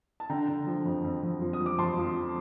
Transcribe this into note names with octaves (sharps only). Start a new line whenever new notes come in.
A5
D3 G5 A#5
D3
F3
F2
F2
F2
F3
D#6
F3
D6
F2 A5 C6
F3